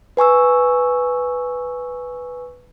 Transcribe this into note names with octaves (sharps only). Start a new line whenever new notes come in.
B4 G#5 C#6 E6